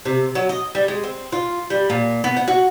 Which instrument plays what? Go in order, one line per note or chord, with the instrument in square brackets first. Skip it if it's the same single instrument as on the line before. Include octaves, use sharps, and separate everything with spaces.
[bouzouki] C3
F#3
D#5
G3
G#3
C4
F4
G3
A#2
B3
F#5
F#4